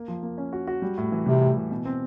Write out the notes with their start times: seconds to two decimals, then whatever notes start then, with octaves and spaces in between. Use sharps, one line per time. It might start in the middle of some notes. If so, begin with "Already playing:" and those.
Already playing: A#3
0.08 F3
0.23 A#3
0.38 C#4
0.53 F#4
0.67 F#4
0.82 G3
0.98 A2
1.12 E3
1.26 C3 G3
1.41 A2
1.57 E3
1.71 B2
1.85 C4